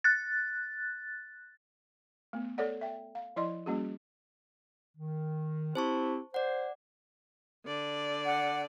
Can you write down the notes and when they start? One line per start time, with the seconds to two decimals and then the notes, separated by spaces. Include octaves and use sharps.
0.04 F#6 A6
2.33 A3 B3
2.58 A4 C#5 D5 F#5
2.81 E5 G5
3.15 F5
3.36 F3 E4 D5 D#5 C6
3.66 G3 A#3 C#4 F#4 G#4
4.98 D#3
5.75 C4 E4 G4 C5 A5 C#6
6.34 C5 D5 F#5
7.66 D3 D5
8.25 F#5